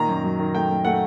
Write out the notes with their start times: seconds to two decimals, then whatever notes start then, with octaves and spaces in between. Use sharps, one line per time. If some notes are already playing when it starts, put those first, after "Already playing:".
Already playing: A#2 D#3 A#5
0.09 F#2
0.24 F#3
0.39 D#3
0.54 A3 G5
0.70 F#2
0.85 A3 F#5